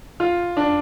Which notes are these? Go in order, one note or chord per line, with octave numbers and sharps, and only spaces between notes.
F4
D4